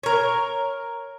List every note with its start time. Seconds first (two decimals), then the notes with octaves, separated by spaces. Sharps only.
0.03 A#4 C#5